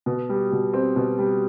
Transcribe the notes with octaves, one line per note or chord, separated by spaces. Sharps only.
B2
G3
B2
C4
B2
G3